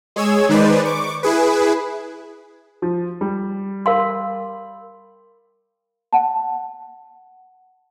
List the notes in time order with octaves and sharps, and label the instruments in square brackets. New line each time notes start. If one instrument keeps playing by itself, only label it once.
[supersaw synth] G#3 G#4 C#5 E6 G#6
D#3 G#3 D#4 B4 C5 D5
C#6 D6
E4 G#4 B4
[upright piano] F3
G3
[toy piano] A#4 F5 C6
[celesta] F#5 A5